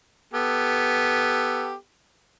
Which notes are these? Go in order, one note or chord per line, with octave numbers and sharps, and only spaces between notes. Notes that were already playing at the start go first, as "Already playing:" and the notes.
B3 G4 A4